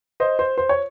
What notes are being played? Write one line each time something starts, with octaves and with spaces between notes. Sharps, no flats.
C5 D#5
C5
C5
C#5